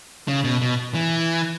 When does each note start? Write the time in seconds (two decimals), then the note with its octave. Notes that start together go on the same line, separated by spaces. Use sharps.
0.28 C#3
0.44 B2
0.61 B2
0.94 E3